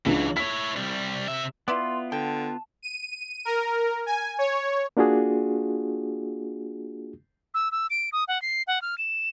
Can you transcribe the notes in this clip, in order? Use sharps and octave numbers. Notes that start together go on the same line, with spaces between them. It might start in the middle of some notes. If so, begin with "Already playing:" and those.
C#2 E3 F#3 D4
E4 C#5 B6
C2 G3
C3 E5
B3 E4 F4 B4 D5 C6
D3 G5 A5
D#7
A#4
G#5
C#5
A#3 D4 F4 F#4 G#4
E6
E6
D7
D#6
F#5
C7
F#5
F6
E7